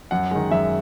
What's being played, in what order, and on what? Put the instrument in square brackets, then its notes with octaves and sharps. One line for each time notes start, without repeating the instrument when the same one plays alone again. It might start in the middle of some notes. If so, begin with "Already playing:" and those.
[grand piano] F#2 F#5
D#3 G#3
F#2 E5